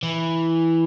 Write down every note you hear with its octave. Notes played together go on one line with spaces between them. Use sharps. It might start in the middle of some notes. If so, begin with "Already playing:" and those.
E3